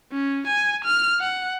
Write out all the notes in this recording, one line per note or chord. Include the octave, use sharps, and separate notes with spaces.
C#4
G#5
F6
F#5